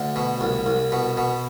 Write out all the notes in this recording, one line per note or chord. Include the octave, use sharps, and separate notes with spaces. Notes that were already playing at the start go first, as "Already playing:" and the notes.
Already playing: D2 D3
B2
C2
C2
B2
B2